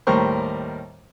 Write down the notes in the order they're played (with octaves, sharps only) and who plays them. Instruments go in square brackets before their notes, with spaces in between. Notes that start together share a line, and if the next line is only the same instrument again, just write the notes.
[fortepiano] D#2 A2 G3 A#4 C5 C#6